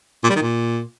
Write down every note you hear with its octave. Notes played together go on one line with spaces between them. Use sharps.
A#2
G3
D#3
A#2